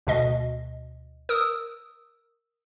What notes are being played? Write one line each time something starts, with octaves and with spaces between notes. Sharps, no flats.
D2 B2 D#5
A#4 D#6 E6